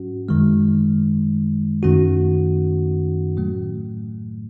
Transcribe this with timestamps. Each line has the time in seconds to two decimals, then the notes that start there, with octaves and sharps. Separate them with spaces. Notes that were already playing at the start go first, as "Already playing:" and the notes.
Already playing: G#2 F#3 C#4 F#4
0.29 F#2 D#3 G#3
1.83 F#2 D#3 A3 C#4 F#4
3.37 A2 F#3 A3